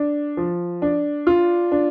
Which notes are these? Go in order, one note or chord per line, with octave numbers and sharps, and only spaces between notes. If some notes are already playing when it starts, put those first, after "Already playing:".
Already playing: D4
F3
D4
F4
D4